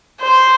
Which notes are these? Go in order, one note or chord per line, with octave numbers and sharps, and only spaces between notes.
C5